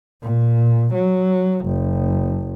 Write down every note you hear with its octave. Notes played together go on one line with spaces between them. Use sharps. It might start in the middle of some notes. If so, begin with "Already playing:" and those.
A#2
F#3
F#1